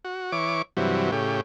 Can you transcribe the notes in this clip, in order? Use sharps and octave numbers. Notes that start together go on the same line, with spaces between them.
F#4
E3 C#5 D6
G2 C3 E3 F#3
A2 C#3 G4